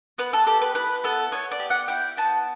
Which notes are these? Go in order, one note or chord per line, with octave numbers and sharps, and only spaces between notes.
B3 B4
A4
G4 A4
B4
E4 B4
B3 A4
B3 C#5
D5
G4
F#5
E4 G5
B3 A5